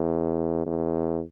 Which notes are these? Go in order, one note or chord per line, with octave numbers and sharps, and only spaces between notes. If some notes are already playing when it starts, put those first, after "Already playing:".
Already playing: E2
E2